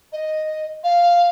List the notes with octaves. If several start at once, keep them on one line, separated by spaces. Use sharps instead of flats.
D#5
F5